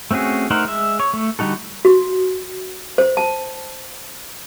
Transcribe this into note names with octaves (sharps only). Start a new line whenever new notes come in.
A3 C4 C#4 F#4 G#4
A3 D#4 A#4 C5 F#5
G#3 E5
C#5
A3
D3 G3 D#4 F#4 A4
F#4
C5
A5